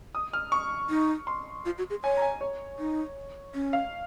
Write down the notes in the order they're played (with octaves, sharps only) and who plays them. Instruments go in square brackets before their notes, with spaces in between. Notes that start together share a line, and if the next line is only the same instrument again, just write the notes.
[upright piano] D#6
F6
C#6
[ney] D#4
[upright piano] C6
[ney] F4
F#4
G#4
[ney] C#5 [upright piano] G#5
[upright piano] A#5
G#5
C#5
[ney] D#4
C#4
[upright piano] F5